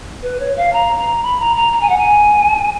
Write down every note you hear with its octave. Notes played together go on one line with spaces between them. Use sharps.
B4
C#5
F5
A#5
A#5
B5
A#5
A#5
A#5
G#5
F#5
G#5